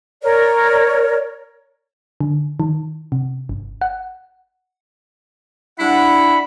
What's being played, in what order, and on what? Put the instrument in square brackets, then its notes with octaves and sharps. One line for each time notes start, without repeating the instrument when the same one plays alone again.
[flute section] A#4 C#5 D5
[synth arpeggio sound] D3
D#3
C3
G1
F#5
[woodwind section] G3 D4 F#5 [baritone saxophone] E4 [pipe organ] B5